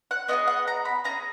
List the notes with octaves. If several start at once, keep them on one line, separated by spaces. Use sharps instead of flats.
F#5
B3 E4 G#4 D#5
F#5
A#5
B5
C#4 E4 G#4 A#5